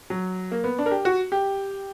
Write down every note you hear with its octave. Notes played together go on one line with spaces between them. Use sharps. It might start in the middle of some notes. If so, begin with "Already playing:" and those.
F#3
A#3
B3
D4
A#4
G4
F#4
G4